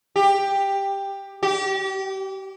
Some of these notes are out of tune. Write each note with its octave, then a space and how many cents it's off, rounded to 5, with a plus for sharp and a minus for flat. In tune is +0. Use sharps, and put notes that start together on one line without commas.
G4 +10
G4 -30